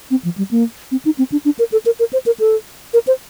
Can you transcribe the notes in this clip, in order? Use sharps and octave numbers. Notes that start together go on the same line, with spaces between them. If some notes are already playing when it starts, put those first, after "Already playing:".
C4
F3
G3
A#3
C4
D#4
C4
D4
D4
A#4
A4
A#4
A#4
C5
A#4
A4
A#4
C5